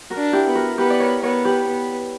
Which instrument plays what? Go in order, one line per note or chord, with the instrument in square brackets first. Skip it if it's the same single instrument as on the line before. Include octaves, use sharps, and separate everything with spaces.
[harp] F#4 A#4
[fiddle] D4
[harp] E4 G4
[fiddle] B3
[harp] F#4 A#4
[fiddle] B3 [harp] G4 B4
[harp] D5
A#4 C#5
[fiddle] B3 [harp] A#4 C#5
[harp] G4 B4
[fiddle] B3